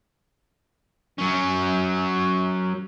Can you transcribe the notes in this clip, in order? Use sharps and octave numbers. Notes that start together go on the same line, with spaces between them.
F#3 C#4